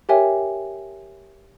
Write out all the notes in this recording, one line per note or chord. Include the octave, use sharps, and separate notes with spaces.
G4 A#4 C#5 E5 G5 G#5